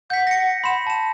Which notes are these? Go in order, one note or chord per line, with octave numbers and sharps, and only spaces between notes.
F#5 G6 B6
A#6 C#7
B5 C6 E7
A5 E7